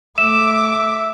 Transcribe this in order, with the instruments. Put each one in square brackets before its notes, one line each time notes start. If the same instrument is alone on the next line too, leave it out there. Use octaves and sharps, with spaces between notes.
[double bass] A3 [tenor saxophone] E5 [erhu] D6 [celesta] E7